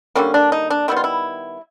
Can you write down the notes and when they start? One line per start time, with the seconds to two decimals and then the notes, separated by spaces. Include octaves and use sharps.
0.15 D3 G3 A#3 C#4
0.34 D4
0.52 D#4
0.70 D4
0.88 D#3 G3 B3 E4
0.96 F4
1.04 E4